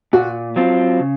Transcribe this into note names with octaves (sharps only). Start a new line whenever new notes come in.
A#2 F#4
F#3 C4 F4
C#3